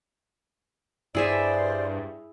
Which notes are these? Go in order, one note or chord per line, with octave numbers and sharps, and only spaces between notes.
G2 E4 G#4 C5 D5 E5